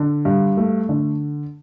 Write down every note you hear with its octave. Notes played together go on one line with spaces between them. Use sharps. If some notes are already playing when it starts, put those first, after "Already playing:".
Already playing: D3
G2
A3
D3